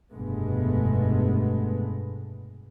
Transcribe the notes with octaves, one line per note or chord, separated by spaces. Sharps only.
F1 G2 B2 G#3 A3 B3